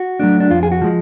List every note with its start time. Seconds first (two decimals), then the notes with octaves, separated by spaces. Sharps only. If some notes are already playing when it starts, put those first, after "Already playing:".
Already playing: F#4
0.20 F#3 A3 D4
0.40 D4
0.50 F2 F4
0.63 G#4
0.72 F#4
0.82 F3 G#3